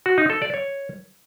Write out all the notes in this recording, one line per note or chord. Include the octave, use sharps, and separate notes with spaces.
F#4
D#4
A4
D5
C#5